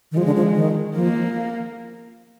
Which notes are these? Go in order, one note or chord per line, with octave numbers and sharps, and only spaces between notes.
D#3
F3 G#3
D3
F3
D#3
F3 A#3